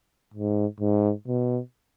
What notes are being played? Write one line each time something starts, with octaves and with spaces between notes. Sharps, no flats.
G#2
G#2
B2